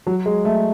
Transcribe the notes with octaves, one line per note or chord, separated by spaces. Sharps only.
F#3
G#3
A3